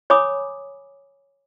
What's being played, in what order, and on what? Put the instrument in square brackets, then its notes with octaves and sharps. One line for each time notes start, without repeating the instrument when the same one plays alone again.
[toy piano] C#5 G#5 B5 D6 D#6